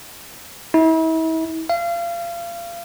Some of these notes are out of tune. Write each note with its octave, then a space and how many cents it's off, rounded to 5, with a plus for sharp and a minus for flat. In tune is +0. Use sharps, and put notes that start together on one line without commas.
E4 -40
F5 -30